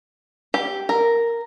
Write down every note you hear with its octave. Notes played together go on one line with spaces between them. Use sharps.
G4
A#4